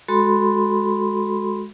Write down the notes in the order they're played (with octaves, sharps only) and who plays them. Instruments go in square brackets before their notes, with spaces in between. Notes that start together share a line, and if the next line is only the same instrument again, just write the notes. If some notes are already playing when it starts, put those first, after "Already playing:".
[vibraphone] G#3 F#4 A4 B5 C6